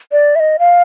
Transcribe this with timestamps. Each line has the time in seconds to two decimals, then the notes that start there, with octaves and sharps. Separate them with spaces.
0.12 D5
0.36 E5
0.40 D#5
0.59 F5